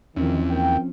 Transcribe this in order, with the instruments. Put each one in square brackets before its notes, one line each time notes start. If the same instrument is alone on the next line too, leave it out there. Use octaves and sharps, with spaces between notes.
[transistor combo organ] E2 [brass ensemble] D#3 [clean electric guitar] F3 C4 C#4
[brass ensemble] A#3 G5